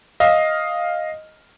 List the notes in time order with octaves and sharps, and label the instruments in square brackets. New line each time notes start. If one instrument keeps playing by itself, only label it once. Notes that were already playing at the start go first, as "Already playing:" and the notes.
[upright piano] D#5 F5